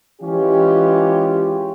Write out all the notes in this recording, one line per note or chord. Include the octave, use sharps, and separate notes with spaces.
E3 G#3 C#4 F4 G4